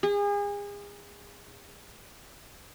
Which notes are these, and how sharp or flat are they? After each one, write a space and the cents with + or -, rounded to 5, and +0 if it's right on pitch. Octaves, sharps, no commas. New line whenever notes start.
G#4 -35